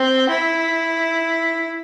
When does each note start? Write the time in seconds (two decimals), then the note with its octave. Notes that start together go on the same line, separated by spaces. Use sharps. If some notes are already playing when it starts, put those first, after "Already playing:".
Already playing: C4
0.29 E4